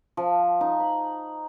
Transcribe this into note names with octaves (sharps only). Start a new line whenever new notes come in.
F3
D#4
B5